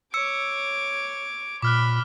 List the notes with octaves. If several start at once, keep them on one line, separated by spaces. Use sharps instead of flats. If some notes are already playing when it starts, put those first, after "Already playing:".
C#5 D6 E6 C#7
A#2 B5 D6 F6 F#6